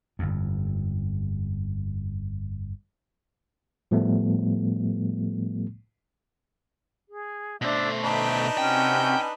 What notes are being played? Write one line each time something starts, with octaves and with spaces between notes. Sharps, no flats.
G1 F2
A2 F3 G3 A3 B3
G#4
B2 A3 D4 C5 E5 E6
D4 D#4 B4 E5 G5
C3 C4 C#4 F#4 G5 G#5